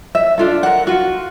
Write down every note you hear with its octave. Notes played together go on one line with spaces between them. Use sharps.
E5
D4 F4 A4
A#4 F#5
F4 F#4